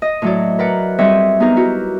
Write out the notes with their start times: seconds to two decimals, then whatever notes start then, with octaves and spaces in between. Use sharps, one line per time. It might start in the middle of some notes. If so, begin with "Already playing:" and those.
0.02 D#5
0.22 A2 F#3 D5
0.59 A#4 B4 D5 F#5
0.99 G3 C4 G#4 C#5 D#5 E5
1.40 B3 D#4 G4 G#4 A#4
1.56 E4 F#4 G4